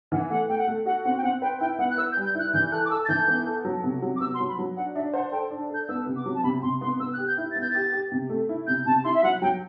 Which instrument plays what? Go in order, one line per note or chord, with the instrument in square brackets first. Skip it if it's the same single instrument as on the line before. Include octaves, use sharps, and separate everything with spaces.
[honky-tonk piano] E3 [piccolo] F#5
[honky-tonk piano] A3 [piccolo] F#5
[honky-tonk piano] A3 [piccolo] G5
[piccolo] F#5
[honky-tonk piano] A3
[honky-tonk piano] F#4 [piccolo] F#5
[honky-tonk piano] C4 [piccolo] F#5
[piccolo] G5
[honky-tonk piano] C4 [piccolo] F#5
[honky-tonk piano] B4 [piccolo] G5
[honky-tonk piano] E4 [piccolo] G5
[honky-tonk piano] B3 [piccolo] F#5
[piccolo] F#6
[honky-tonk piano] B4 [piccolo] E6
[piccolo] G6
[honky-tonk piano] G3
[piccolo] G6
[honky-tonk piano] E4 [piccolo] F#6
[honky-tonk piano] E3 [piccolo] G6
[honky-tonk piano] A4 [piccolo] F#6
[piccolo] D6
[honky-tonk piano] A4 [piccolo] E6
[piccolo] A6
[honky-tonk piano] E3 [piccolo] G6
[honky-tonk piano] B3
A4
F#3
C3
F#3
[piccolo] D6
[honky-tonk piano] B3 [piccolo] E6
[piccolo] C6
[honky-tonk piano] F#3
[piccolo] B5
[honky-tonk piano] F#3
[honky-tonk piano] D4 [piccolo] F#5
[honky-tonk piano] D4 [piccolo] E5
[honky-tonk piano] C5 [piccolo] F#5
[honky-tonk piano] A4 [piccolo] G5
[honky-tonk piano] D4
[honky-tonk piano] A4 [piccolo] G6
[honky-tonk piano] B3 [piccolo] E6
[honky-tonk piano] C3
[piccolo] D6
[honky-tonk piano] F#3
[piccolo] A5
[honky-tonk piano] C3 [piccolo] B5
[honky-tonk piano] C3 [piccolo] C6
[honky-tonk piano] B3 [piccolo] C6
[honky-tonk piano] B3 [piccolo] E6
[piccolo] F#6
[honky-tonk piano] G4
[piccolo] G6
[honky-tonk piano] E4
[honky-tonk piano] B3 [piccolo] A6
[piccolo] G6
[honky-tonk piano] G4 [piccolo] A6
[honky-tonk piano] G4
C3
A3
E4
[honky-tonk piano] C3 [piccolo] G6
[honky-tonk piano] C3 [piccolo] A5
[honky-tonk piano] E4 [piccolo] C6
[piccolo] E5
[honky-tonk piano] F#3 [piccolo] F#5
[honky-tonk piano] F#3 [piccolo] G5